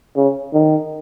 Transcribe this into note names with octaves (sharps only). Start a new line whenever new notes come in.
C#3
D#3